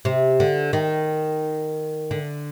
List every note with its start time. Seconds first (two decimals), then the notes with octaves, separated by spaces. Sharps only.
0.05 C3
0.40 D3
0.73 D#3
2.11 D3